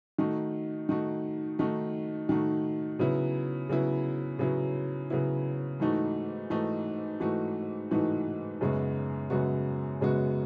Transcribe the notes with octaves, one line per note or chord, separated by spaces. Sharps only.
D#3 A3 D#4 F#4
D#3 A3 D#4 F#4
D#3 A3 D#4 F#4
D#3 A3 D#4 F#4
C#3 F#3 B3 E4
C#3 F#3 B3 E4
C#3 F#3 B3 E4
C#3 F#3 B3 E4
G#2 E3 A3 D#4 F#4
G#2 E3 A3 D#4 F#4
G#2 E3 A3 D#4 F#4
G#2 E3 A3 D#4 F#4
F#2 C#3 G#3 B3 F#4
F#2 C#3 G#3 B3 F#4
F#2 C#3 G#3 B3 F#4